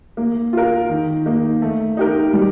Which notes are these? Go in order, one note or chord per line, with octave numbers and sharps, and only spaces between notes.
A#3
F4 A#4
D#3
A#3 D#4
A3
D#4 G4 A#4
G3